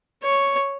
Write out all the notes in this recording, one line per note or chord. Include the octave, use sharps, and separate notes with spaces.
C#5